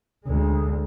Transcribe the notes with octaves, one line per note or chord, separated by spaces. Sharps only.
D2 G#3